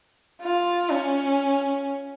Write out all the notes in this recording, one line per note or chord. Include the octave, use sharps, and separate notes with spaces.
F4
C#4